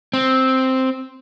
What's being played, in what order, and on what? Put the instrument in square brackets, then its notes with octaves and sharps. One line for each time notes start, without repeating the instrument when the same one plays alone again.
[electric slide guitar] C4